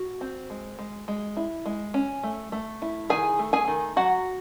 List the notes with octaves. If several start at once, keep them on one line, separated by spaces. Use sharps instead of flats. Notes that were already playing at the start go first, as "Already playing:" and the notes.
Already playing: F#4
C4
G#3
G#3
G#3
E4
G#3
C#4
A3
A3
E4
D#3 G#4 G#5
A3
G#4 G#5
D#3
F#3 F#4 F#5